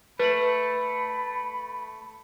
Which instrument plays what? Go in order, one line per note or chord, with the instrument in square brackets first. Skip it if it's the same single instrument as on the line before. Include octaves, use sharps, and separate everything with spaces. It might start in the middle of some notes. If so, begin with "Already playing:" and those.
[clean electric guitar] A3 [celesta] B4 F#7 [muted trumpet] B5